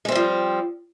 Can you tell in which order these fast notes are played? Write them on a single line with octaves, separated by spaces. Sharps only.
G#3 C4 G3 F3